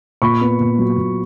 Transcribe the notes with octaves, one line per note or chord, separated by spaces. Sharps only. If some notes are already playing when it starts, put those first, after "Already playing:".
A#2 B5 C#6
B3
A#2
F#3
A#2